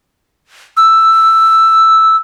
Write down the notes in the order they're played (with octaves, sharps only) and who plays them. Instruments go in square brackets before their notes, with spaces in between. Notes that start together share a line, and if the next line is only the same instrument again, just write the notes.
[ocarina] E6